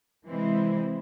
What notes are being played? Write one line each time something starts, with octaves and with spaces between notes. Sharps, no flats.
C3 E3 G#3 C4 E4